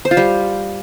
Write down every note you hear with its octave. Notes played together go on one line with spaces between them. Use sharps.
C5
F4
G3